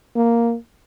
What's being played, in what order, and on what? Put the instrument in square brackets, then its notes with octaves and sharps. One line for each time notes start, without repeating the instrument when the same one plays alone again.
[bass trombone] A#3